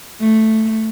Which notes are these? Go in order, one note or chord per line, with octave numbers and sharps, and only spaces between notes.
A3